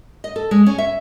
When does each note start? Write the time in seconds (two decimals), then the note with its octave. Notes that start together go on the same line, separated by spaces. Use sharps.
0.24 D#5
0.36 A4
0.51 G#3
0.66 C#4
0.78 E5